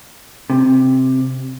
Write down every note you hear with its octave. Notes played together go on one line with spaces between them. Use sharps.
C3